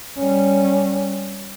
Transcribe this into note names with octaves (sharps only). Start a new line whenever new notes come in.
G3 C#4